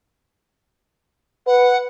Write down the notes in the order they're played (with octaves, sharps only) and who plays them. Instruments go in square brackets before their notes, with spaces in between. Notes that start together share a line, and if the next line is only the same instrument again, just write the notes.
[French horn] B4 [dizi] F#5